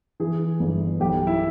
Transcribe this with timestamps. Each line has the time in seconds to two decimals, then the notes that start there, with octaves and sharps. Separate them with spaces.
0.20 E3 G#4
0.60 G1
1.00 B1 G4
1.27 E4